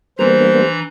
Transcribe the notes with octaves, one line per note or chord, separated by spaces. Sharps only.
E3 G3 A#3 B3 D4 C5 A#5